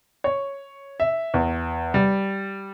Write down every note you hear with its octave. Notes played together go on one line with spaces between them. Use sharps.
C#5
E5
E2
G3